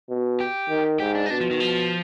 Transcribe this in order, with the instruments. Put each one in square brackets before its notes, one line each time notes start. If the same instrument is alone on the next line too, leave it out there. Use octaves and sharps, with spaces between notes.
[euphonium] B2
[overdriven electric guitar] G4
[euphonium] D#3
[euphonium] G#2 [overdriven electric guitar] G4
[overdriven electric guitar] D4
D#4
[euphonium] B2 [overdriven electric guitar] D4
[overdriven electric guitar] F3
D#3
F3